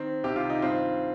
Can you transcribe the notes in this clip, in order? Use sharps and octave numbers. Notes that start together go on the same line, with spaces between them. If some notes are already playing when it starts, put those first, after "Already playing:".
Already playing: D#3 C4
C2 C3 D#3 G4
F4
D#4
G2 D#3 C4 F4